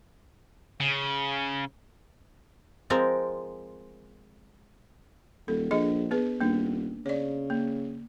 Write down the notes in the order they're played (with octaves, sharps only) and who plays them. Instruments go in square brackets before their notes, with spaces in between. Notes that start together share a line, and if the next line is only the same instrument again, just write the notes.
[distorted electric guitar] C#3
[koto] F3 G#3 C4 A#4
[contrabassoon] D#1 [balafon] A4
[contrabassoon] A#1 [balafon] D4 G#4 D#5
[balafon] B3 G#4 B4
[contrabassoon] D#1 [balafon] A#3 D4
[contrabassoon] C#3 [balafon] C#5 D5
[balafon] A#3